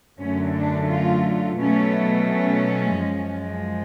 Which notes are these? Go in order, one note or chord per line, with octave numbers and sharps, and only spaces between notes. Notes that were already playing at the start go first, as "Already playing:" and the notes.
F#2 D3 F#3 A3 C#4
D4
F4
B2 F#3 A3 C#4
C#4
F#2 F3 G#3